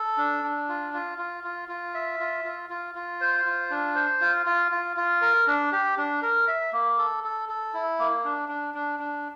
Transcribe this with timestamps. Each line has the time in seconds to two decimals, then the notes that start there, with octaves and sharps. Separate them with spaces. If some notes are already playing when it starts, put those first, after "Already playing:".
Already playing: A4
0.18 D4
0.44 D4
0.69 F4
0.93 F4
1.18 F4
1.44 F4
1.69 F4
1.94 E5
2.20 F4
2.44 F4
2.70 F4
2.95 F4
3.21 C5
3.45 F4
3.71 D4
3.95 C5
4.21 F4
4.46 F4
4.72 F4
4.97 F4
5.22 A#4
5.47 D4
5.72 G4
5.98 D4
6.22 A#4
6.48 E5
6.73 A#3
6.98 A4
7.24 A4
7.49 A4
7.74 E4
7.99 A#3
8.24 D4
8.48 D4
8.74 D4
8.99 D4